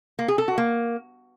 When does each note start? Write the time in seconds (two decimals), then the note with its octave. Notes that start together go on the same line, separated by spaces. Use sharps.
0.19 A#3
0.28 G#4
0.38 A4
0.48 F#4
0.58 A#3